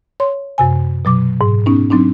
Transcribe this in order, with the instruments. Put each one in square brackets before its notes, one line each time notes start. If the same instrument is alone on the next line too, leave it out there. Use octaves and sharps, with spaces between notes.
[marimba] C#5 C6
F#2 C3 G#5
B2 F#3 D6
G#2
B3 C#4 D#4
F#3 C4 D4 D#4